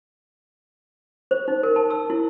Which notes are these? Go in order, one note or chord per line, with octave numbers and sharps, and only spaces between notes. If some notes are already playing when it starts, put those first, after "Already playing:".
C5
D#4
A#4
A5
E6
E4